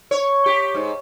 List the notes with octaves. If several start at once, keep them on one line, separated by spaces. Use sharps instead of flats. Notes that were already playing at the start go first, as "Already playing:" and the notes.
C#5
G4
G#2